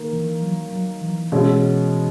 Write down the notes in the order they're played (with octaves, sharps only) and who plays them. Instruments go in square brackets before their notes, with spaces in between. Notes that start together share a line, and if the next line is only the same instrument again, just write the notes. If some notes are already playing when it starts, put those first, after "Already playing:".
Already playing: [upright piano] D#3 A#3
[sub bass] E3
F#3
F#3
E3
[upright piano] B2 G#3 C#4 [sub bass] E3